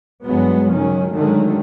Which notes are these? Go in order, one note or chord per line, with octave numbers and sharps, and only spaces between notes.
G1 G2 F#3 G#3 B3
C#2 D#3 F#3 C#4
G#2 D3 D#3 F#3 G#3 A3